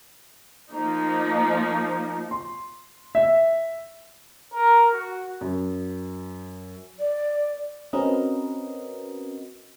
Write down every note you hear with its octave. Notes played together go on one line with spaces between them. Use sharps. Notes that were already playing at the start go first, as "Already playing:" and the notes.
F3 A#3 D#4
C6
E5
A#4
F#4
F#2
D5
C4 C#4 F#4 A#4 B4 D#5